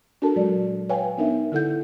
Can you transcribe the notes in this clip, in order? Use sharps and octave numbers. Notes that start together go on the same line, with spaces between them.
D4 F#4 A4 A#4 A5
A#2 F#3 G#3 D5
B4 C#5 F5 G5 G#5
B3 D4 D#4 A#4 E5
D3 E4 A4 F#5 G6